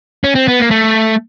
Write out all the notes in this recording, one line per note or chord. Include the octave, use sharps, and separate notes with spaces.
C#4
C4
B3
A#3
A3